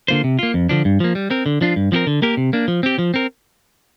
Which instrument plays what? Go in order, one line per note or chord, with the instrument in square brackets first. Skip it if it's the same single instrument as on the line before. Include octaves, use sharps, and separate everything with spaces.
[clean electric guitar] D3 A#3 F4 C5
C3
A#3 F4
F2
D3 F3 D4
G2
F3 A#3
G3
C4 A#4
D3
F3 D4 F4
G2
F3 C4 G4 A#4
D3
A#3 G4 A#4
C3
A#3 D4
F3
C4 G4
F3
C4 A#4